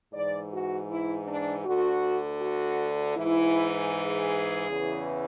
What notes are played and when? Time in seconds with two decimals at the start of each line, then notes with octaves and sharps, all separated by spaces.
0.14 G#2 E3 D5
0.52 F#4
0.90 E4
1.27 D4
1.66 D2 D3 F#4
2.41 F#4
3.17 G#2 E3 E4
3.93 G#4
4.69 E2 C#3 E3